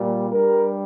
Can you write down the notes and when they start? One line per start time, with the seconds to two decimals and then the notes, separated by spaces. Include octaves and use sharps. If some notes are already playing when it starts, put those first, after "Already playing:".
Already playing: A#2 G3
0.30 G2 G3 A#4